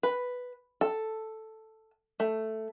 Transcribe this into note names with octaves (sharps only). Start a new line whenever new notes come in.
B4
A4
A3